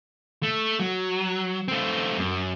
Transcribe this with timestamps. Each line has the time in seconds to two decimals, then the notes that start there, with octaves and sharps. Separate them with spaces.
0.43 A3
0.79 F#3
1.68 A3 C4
2.18 F#2